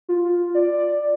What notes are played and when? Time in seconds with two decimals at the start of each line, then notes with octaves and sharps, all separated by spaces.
0.09 F4
0.55 D5